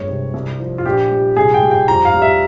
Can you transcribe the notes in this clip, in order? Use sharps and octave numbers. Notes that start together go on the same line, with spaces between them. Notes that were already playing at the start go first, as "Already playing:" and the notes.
Already playing: G1 G#3 C#5
C3
C2
F3
F4
A#1 G4
G3
C2 G#4
G5
G3
G5
F2 A#5
F5
G3
E5